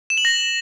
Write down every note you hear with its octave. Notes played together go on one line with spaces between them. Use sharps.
E7
F#7
A#6